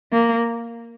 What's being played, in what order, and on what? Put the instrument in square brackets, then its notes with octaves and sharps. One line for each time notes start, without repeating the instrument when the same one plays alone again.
[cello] A#3